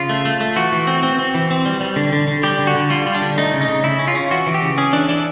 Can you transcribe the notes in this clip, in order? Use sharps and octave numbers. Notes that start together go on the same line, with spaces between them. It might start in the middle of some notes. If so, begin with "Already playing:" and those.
Already playing: C#3 F4
A3
A3
A3
E3 F#4
E3
C4
C4
C4
E3
C4
G3
G3
D3
D3
D3
G3 G4
D3
F#4
D3
G3 F4
G3
D4
D3
A3 D#4
C#3
D#4
C#3
C#3 E4
C#4
F4
C#4
E3 F#4
E3
G4
C#3
C#4 G#4
E3 D4
E3 D4